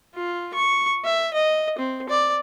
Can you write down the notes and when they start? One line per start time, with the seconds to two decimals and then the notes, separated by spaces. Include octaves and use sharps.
0.15 F4
0.54 C#6
1.05 E5
1.34 D#5
1.78 C4
2.09 D5